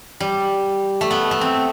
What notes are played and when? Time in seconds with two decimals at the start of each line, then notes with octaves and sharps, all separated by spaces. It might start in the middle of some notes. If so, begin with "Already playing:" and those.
0.20 G3
1.01 A3
1.11 B3
1.31 A3
1.41 C4